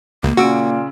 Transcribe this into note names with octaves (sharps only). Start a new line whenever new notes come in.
C#2 A#3
A#2 C#3 F#4 E6 D7